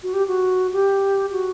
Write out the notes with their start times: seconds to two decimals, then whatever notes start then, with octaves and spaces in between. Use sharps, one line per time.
0.03 F#4
0.13 G4
0.27 F#4
0.73 G4
1.32 F#4